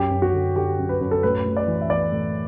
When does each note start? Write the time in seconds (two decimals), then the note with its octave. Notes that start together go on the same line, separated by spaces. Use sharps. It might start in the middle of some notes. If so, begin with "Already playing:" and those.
Already playing: F#2 G4
0.11 F#2
0.22 F#4
0.33 D3
0.56 D3 G4
0.79 F#2
0.89 B4
1.01 F#2
1.11 A4
1.23 A2 B4
1.46 A2
1.57 D5
1.67 E3
1.81 E5
1.90 E3 D5
2.12 A2